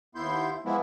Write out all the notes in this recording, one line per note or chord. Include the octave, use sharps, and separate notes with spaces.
D#2 B3 E4 C6 G6
E3 F3 G#3 B3 E4